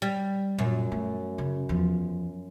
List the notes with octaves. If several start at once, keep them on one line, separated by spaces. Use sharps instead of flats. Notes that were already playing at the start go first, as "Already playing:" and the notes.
G3
F#2 A#2
A3
C#3
E2 F3